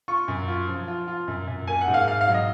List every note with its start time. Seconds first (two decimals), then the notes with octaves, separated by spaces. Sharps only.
0.08 F4 C#6
0.28 F#2
0.48 F4
0.68 F3
0.88 F4
1.07 F4
1.28 F#2
1.47 F#2
1.67 A#3 G#5
1.81 F#5
1.88 G#2
1.94 F5
2.07 G#2 F5
2.21 F5
2.28 F#3
2.34 D#5